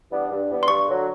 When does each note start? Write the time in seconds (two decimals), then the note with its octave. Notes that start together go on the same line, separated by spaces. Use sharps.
0.11 E3 G3 B3 D4
0.30 G2
0.49 E3 G3 B3 D4
0.63 C6
0.68 G2 C#6
0.87 D3 F#3